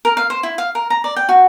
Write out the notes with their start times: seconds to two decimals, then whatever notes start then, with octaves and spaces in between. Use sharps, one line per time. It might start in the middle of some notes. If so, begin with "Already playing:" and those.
0.05 A#4
0.17 F5
0.30 C5
0.43 E4
0.58 F5
0.75 A#4
0.90 A#5
1.04 D5
1.16 G5
1.29 F#4